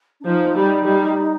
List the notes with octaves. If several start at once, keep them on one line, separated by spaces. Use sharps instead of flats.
D4
F3 D#4
G3
G3